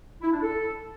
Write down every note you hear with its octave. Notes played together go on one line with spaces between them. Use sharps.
E4
D4
A4